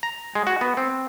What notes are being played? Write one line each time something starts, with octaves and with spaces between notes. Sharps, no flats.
A#5
G#3
F#4
B3
C4